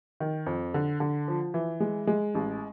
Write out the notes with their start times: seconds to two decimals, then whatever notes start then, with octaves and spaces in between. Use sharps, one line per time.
0.20 D#3
0.46 F2
0.74 D3
1.00 D3
1.28 F3
1.54 E3
1.80 G#3
2.07 G#3
2.35 A1